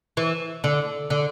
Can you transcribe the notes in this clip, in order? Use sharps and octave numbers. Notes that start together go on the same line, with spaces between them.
E3
D3
D3